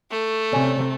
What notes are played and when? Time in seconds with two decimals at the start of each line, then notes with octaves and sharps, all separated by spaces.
0.11 A3
0.53 C3 C#4 D5